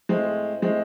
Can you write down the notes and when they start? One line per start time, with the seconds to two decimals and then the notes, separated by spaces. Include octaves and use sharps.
0.09 A2 G#3 C4
0.62 A2 G#3 C4